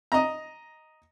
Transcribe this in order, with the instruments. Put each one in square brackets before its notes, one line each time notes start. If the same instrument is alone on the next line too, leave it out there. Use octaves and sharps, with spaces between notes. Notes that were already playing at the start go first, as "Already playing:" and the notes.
[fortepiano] D#5 A#5